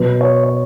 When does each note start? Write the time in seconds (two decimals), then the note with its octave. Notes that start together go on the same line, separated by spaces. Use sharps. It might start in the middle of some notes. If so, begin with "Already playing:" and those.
Already playing: B2 F#3 B4
0.21 C#5
0.44 C#5